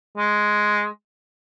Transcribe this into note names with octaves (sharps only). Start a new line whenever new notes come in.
G#3